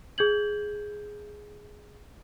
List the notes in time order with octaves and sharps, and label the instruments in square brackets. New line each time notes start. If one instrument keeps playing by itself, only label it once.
[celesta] G#4 G6 G#6 F#7